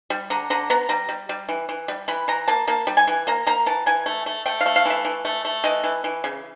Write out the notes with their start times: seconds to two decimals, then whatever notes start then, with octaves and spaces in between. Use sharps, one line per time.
0.10 G3
0.30 D3 A#5
0.50 D3 A#5
0.70 B3 A#5
0.89 G3 A#5
1.09 G3
1.29 G3
1.49 E3
1.69 E3
1.88 G3
2.08 E3 B5
2.28 E3 A#5
2.48 A#3 A5
2.67 A#3 A5
2.87 G3
2.97 G#5
3.07 E3
3.27 A#3 A#5
3.46 A#3 A#5
3.66 E3 A5
3.86 E3 G#5
4.06 A3
4.26 A3
4.46 A3 G5
4.61 F5
4.66 A3
4.76 F5
4.85 E3 E5
5.05 E3
5.25 A3
5.45 A3
5.64 E3 D#5
5.84 E3
6.04 E3
6.24 C#3